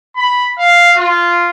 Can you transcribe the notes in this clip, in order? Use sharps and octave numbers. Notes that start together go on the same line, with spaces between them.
B5
F5
F4